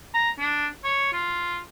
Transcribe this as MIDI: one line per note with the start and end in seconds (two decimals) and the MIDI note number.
0.14 0.31 82
0.40 0.67 62
0.84 1.12 73
1.13 1.59 65